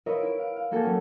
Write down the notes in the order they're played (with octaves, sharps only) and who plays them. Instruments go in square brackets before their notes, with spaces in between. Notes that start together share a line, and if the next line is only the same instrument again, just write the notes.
[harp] F4 A#4 B4 C#5 D#5 E5
E4 D7
F5 D7
F5
A3 A#3 F#4 A4 G5 G#5
F#3 A3 C#4